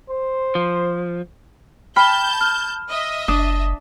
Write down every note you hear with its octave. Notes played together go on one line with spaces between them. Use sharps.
C5
F3
G5 A5 B5 F6 G6
F6
D#5 E5
F#1 D4 D#6